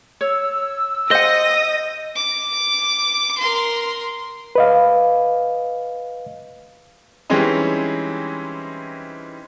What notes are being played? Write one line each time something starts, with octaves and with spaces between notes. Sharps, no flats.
C#5 E6
C5 D#5 F#5 D#6 A#6
D6
A#4 C6
B4 D#5 F5
E3 G3 G#3 C4 C#4 D#4